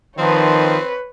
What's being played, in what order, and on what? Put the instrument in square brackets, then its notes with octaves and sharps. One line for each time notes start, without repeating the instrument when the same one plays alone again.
[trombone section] D#3 F3 [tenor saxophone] C4 [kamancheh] B4 C#5